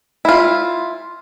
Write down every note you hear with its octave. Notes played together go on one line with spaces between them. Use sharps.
E4 F4